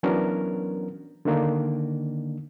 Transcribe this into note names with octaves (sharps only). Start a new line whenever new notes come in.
E3 F#3 B3 C#4 D4 A#4
D3 D#3 A#3 D4 D#4